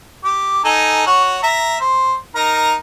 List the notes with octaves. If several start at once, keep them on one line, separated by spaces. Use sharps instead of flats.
G4
D#4 A4 G#5
F#4 C#5
E5 A#5
C5
D#4 A#4 A#5